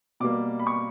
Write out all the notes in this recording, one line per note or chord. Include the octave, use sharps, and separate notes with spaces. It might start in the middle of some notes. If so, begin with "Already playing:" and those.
B2 G3 A#3 D6
B5
C#6